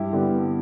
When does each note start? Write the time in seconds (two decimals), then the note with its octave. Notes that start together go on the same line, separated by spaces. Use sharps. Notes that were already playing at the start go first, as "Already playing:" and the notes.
Already playing: G2 E4 G4
0.13 D3 G3 B3